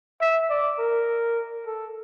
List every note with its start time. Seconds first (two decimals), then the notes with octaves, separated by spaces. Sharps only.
0.21 E5
0.50 D5
0.79 A#4
1.66 A4